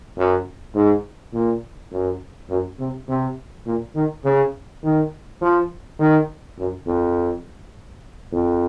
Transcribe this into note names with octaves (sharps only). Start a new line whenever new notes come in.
F#2
G#2
A#2
F#2
F#2
C3
C3
A#2
D#3
C#3
D#3
F3
D#3
F#2
F2
F2